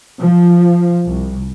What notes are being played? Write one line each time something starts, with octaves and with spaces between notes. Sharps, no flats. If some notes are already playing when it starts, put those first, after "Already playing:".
F3
C2